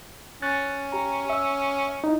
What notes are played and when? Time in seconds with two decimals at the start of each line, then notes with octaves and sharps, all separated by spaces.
0.42 C#4 F#6 A6
0.92 G4 A#5
1.30 E5 E6
2.04 D#4 E4